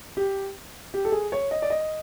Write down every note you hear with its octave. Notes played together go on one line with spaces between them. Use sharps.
G4
G4
A4
G#4
C#5
D#5
D5
D#5